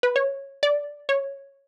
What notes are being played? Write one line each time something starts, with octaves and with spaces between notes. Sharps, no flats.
B4
C#5
D5
C#5